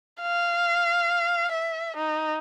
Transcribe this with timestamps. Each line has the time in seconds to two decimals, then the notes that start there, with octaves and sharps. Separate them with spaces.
0.21 F5
1.51 E5
1.96 D#4